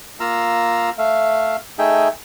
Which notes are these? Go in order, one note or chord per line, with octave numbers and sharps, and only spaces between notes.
A#3 F4 F5 A#5 E6
A3 E5 F5
A3 D#4 G#4 E5 G5